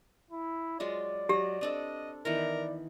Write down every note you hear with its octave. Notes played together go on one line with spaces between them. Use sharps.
E4
F#3 G#3 F4 D5
F#3 G4 D#5
C4 D4 A4 D#5
D#3 E3 B3 A#4 D5